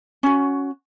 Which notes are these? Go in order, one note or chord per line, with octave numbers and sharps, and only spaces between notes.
C#4 F#4